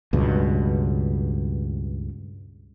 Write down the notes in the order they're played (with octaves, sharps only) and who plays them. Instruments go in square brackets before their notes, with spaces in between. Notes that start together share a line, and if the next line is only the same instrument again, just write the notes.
[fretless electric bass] C#2 G2 B2